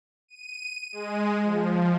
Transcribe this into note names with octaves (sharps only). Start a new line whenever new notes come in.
D#7
G#3
F3